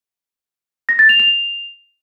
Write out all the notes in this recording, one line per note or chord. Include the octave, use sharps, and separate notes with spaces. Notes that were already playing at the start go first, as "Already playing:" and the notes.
A#6
A6
F7
F7